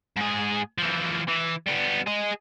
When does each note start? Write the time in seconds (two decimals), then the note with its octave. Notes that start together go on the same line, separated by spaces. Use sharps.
0.16 G#2 G#4
0.78 E3 F3
1.29 E3
1.68 G3 B3
2.07 G#4 D#5